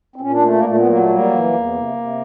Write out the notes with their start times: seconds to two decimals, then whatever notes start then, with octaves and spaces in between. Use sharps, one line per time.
0.16 C4
0.21 A#2 C#4
0.32 D4
0.43 A3
0.53 A#3
0.64 A#2 A3
0.76 B3
0.87 F#3 A#3
0.98 A3
1.09 G3 A#3
1.31 E3
1.53 E2
1.75 C3
1.96 C3